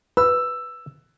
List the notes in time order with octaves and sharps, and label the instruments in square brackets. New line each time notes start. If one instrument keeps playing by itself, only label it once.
[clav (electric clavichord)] B4 [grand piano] E6